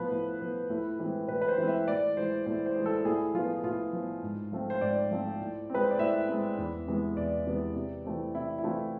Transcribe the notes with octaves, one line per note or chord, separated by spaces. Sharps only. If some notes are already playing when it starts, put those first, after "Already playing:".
Already playing: A2 F3 B3 B4 C5
A2
F3 B3
A2
E3 G#3 C4
A2 B4
B4
C5
E3 G#3 C4
E5
A2 D5
E3 G#3 C5
A2 C5
C5
E3 G#3
A4
A2 G#4
F3 B3 F4
A2 F4
F3 B3
G#2
F3 A3 C4
C5
G#2 D5
F3 A3 C4
A2
G#3 C4 B4
C5
D5
A2 E5
G#3 C4
E2
C3 E3 G#3 B3
E2 D5
C3 E3 G#3 B3
C3
E3 A3 C4
C3 E4
E4
E3 A3 C4 F4